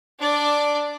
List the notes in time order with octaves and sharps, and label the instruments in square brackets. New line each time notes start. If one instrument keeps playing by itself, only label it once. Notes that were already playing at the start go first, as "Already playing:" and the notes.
[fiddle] D4 D5